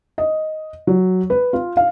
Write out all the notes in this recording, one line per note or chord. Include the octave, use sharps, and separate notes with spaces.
D#5
F#3
B4
F4
F5